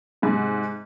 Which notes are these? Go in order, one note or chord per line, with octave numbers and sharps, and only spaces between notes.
G#2 C3